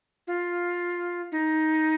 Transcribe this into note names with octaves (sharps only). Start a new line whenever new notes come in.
F4
D#4